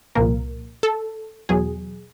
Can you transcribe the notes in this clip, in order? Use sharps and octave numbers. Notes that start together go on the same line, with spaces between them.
C2 A#2 F3 A#3 A#4
A4
E2 B2 F#3 G#4